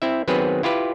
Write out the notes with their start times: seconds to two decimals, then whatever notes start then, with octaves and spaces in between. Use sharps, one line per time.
0.02 C4 E4 E5
0.28 D#3 F#3 B3 C4 G#4 B4
0.63 E4 F4 G4 B4